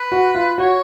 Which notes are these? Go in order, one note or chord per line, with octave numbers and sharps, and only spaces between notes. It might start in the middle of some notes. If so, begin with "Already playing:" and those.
Already playing: B4
F#4
F4
F#4 C#5